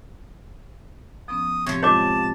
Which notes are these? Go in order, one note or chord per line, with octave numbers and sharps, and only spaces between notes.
F3 B3 C#4 D#6
A2 C3 F3 C#5
G#3 F4 C5 C#5 D#5 A5 D6